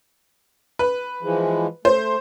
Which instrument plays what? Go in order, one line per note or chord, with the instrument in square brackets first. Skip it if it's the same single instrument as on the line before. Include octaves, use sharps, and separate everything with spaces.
[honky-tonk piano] B4
[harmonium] E3 F3 G#3
[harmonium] A3 [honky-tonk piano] C5